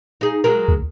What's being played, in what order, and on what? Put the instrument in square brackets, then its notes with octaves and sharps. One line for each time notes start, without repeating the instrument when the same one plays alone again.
[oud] D#4 G#4
F#3 G#3 A#4
[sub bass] D2